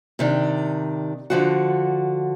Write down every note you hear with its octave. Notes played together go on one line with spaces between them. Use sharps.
C3 D#3 D4
D3 F3 F#4